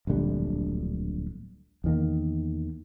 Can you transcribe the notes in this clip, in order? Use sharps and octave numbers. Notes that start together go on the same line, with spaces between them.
D1 A#1 D3 G3
E2 D#3 A#3